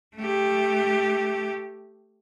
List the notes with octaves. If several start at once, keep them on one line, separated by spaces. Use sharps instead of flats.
A3 G4